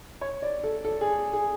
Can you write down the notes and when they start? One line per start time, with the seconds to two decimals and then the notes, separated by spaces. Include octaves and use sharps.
0.21 C#5
0.42 D5
0.64 A4
0.85 A4
1.01 G#4
1.33 G#4